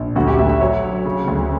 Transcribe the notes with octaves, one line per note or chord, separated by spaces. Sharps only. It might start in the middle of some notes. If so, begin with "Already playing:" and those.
Already playing: A#1
D2 F#4
G4
D2 E5
E5
F#3 C#5
F#3
C#3
D2